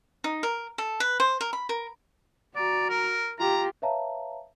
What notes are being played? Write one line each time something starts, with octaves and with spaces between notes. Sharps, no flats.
D#4
A#4
A4
B4
C5
A#4
B5
A#4
F#4 D5 A#5
A#4
F4 G4 A#5
B4 C#5 E5 F5 A5 A#5